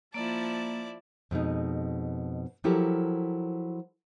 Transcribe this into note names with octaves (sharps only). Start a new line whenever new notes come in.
F3 A#3 E4 D5 A5
F2 B2 G#3 D#4
F3 F#3 E4 G4 A4 A#4